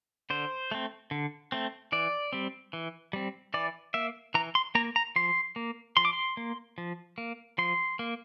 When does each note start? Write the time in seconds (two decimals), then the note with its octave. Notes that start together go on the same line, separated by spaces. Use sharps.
0.30 D3 C5
0.71 A3 C4
1.11 D3
1.52 A3 C4
1.92 E3 D5
2.33 G3 C4
2.73 E3
3.13 G3 C4
3.54 E3 D5
3.94 A#3 E5
4.34 E3 A#5
4.55 C6
4.75 A#3 A#5
4.96 A#5
5.16 F3 C6
5.56 A#3
5.97 F3 C6
6.05 D6
6.13 C6
6.37 A#3
6.78 F3
7.18 A#3
7.58 F3 C6
7.99 A#3